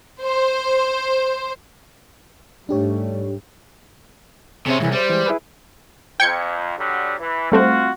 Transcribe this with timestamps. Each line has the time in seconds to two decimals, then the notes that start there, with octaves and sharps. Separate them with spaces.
0.23 C5
2.69 G#2 G3 A3 D4 G4 C#5
4.66 C3 C4 C#4 G#4 C#5 E5
4.81 C2 G#2 E3
4.93 G3 C5
5.10 E3 G#3
5.26 E4 G#4 B4
6.20 F2 G5 G#6 C#7
6.77 D3 F#3 G3
7.20 E3
7.52 G3 A3 C4 F4 F#4